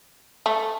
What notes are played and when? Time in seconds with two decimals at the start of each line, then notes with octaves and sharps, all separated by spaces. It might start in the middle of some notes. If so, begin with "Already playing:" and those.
0.46 A3